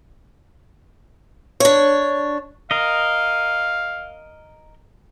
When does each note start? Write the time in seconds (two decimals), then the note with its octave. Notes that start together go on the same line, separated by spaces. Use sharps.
1.60 D4 C#5
2.71 A#4 D#5 F5